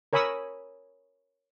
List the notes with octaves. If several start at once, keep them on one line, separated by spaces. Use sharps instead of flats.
A#4 C#5 G#5 B5 D#6 E6